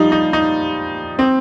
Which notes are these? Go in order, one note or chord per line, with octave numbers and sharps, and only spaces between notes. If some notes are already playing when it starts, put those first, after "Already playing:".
Already playing: F3 G3 D#4
D#4
D#4
C4